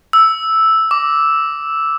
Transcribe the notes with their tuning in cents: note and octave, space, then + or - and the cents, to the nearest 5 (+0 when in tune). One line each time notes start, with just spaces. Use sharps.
E6 -5
D6 -10